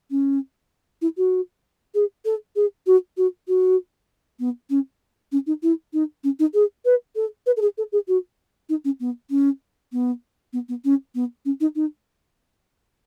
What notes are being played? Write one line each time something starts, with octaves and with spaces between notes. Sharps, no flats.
C#4
E4
F#4
G#4
A4
G#4
F#4
F#4
F#4
B3
C#4
C#4
D#4
E4
D#4
C#4
D#4
G#4
B4
A4
B4
A4
G#4
A4
G#4
F#4
D#4
C#4
B3
C#4
B3
B3
B3
C#4
B3
C#4
D#4
D#4